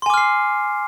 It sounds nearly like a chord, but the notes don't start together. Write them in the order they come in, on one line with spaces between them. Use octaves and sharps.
C6 G#5 D6 F6 C7